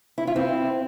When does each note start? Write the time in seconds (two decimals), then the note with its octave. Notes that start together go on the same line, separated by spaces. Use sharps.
0.18 E4
0.27 F4
0.36 C4 E4